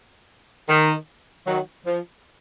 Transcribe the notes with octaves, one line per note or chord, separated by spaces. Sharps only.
D#3
D#3 F#3
F3